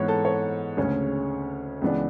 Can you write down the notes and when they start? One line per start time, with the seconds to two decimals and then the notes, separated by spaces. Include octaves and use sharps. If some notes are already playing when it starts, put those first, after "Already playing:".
Already playing: G#2 E3 B3 C#5
0.08 A4
0.25 C#5
0.77 D2 C#3 G#3 C#4
1.81 C#2 C#3 E3 B3 D4